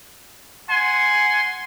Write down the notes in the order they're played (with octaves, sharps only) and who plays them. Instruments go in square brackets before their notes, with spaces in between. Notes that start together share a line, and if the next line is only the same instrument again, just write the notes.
[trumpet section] F#5 G#5 C6